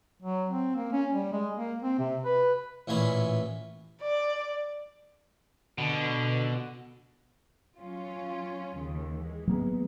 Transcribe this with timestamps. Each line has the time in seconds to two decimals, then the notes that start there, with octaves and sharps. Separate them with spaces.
0.22 F#3
0.49 C4
0.75 A#3
0.92 C#4
1.13 G3
1.32 G#3
1.56 A#3
1.83 C4
1.99 C3
2.25 B4
2.87 A1 A#2 E3 C#4 B5
4.01 D5
5.78 B2 D3
7.79 F#3 C#4 F4
8.75 D#2 C#3
9.11 E3 G#3
9.48 F#3 A#3 B3